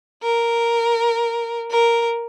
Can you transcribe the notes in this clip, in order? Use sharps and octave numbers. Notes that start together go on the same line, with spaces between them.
A#4
A#4